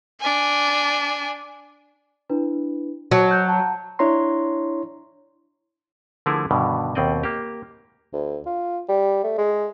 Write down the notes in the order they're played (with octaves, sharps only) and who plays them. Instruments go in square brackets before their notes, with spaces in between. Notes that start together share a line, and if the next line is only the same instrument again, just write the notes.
[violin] D4 G#5
[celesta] D4 E4 B4
[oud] F#3 [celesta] A5
[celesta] F#6 G6
F#5 A5 A#5
[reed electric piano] D4 E4 C#5 A#5 C6
[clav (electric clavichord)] D3 F3 A3 E4 G#4 A#4
G2 B2 D3 D#3
D#2 B2 C4 D5 D#5
A#3 G4
[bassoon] D2
F4
G3
A3
G#3